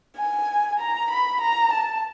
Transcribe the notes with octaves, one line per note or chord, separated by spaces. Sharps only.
G#5
A#5
B5
A#5
A5